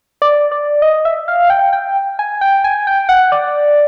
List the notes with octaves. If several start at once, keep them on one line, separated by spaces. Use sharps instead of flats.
D5
D5
D#5
E5
F5
G5
G5
G#5
G5
G#5
G5
F#5
D5